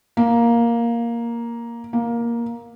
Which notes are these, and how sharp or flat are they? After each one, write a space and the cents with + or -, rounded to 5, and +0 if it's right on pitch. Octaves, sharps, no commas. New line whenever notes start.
A#3 +5
A#3 +10